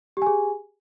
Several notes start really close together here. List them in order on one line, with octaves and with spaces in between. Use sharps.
G4 G#5 G#4